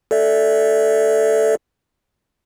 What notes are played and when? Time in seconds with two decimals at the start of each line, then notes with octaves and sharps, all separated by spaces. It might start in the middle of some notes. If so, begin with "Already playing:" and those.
0.11 A4 D5 E5